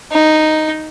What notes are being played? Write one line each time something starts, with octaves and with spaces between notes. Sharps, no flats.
D#4